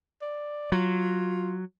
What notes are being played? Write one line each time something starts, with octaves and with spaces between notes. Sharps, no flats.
D5
F#3 F4